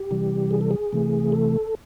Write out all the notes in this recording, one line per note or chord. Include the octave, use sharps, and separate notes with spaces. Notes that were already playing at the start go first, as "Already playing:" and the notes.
Already playing: G4
C3 E3 G3
G#4
A4
G#4
C3 E3 A3
A4